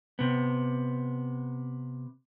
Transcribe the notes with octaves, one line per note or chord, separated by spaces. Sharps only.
C3 B3